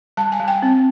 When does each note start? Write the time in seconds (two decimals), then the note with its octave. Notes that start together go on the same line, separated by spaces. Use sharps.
0.17 G3 A5
0.32 G#5
0.40 G3
0.48 G5
0.62 C4